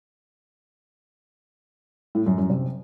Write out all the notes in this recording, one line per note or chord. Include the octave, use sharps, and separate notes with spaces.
A2
F#2
F#2
C3